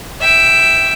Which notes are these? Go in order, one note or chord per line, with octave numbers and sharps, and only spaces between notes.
E5 G5